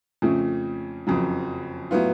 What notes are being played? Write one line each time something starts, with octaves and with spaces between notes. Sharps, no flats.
F2 C#3 F3 A3 C#4
F#1 F2 C#3 F#3
A2 F#3 B3 F4